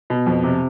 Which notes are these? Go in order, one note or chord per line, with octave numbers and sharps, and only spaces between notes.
B2
F2
C3